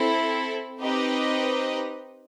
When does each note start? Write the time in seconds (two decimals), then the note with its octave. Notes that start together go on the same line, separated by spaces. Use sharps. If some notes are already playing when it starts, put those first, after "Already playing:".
Already playing: C4 E4 A4
0.79 C4 D#4 G4 B4 D#5